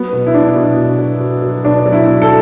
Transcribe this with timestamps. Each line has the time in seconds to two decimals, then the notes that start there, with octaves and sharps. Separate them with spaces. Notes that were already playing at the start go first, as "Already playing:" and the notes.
Already playing: F#3 B3
0.13 B2
0.27 E4
0.34 F#3 D4
0.56 B2
0.77 B2
0.98 F#3
1.20 F#3
1.42 F#3
1.64 B2 D4
1.86 F#3
1.92 E4
2.07 B2
2.22 A4